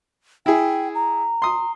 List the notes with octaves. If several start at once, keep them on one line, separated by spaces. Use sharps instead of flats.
E4 G#4 G5
A#5
C6 D#6